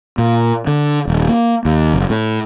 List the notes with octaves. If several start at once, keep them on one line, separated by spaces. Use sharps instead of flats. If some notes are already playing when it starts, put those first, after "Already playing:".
A#2
D3
D#1
A#3
D#2
F#1
A2